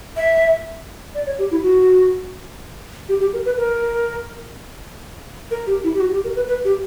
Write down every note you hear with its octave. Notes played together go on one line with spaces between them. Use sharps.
E5
D5
C#5
G4
E4
F#4
G4
G4
A#4
B4
A#4
A#4
G4
E4
G4
F#4
G4
A#4
B4
B4
G4